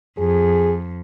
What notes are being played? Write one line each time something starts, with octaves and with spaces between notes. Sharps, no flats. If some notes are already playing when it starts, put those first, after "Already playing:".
F2 G#4